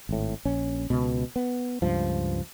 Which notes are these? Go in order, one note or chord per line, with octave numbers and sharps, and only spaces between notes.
G#1 A2
A#1 C#4
C#2 B2
B3
C#2 G2 F3